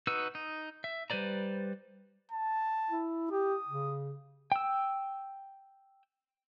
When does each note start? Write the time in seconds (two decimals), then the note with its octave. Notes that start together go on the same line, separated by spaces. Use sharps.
0.07 D#4 F#4 B4 E6
0.35 D#4
0.84 E5
1.10 G3 B4 C5 D5 A#5
2.31 A5
2.90 E4
3.31 G4 D#6
3.68 C#3
4.52 G5 E6